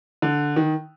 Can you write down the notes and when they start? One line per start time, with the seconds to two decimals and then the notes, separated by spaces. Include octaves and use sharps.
0.22 D3
0.56 D#3